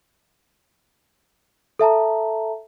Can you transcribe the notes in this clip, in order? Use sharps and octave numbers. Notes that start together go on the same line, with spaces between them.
A4 E5 A5 A#5